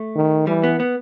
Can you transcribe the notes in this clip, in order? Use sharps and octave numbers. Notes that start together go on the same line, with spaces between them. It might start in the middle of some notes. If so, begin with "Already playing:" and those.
Already playing: A3
D#3
E3 G3
B3
B3